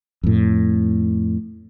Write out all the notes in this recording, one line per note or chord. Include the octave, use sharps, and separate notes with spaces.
F2 A2